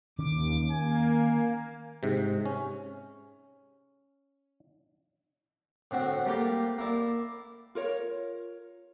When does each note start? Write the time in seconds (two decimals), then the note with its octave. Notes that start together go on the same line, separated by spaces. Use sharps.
0.18 D#2 D#3 C#4 D6
0.71 A#3 G#5
2.03 G#2 C3
2.46 C#4
5.91 A2 D3 C4 F#4
6.25 G3 A3 A#3 F4 G4
6.78 A#3 E4 D5
7.75 F4 A#4 C#5